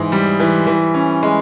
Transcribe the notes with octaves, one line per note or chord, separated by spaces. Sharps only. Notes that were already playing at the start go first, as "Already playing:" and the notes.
Already playing: G#2 E3
G3
E3
E3
C#4
G#3